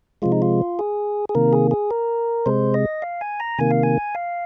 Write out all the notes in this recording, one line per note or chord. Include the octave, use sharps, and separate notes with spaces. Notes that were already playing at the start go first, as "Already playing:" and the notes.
C3 F3 G#3 F4
D#4
F4
G#4
G#4
C3 D#3 A#3 A#4
G#4
G#4
A#4
C3 G#3 C5
D#5
F5
G#5
A#5
C3 D#3 A#3 G#5
F5
G#5
F5